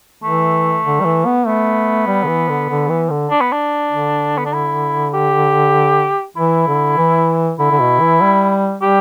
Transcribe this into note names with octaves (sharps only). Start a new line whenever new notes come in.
E3 A3
D3
G3
E3
B3
A3 B3
G3
D3
E3
D3
D3
E3
D3
D4
B3
D4
D3
B3
D4
E4
G4
E3 E4
D3
E3
D3 E4
D3
B2
E3
G3
G3 G4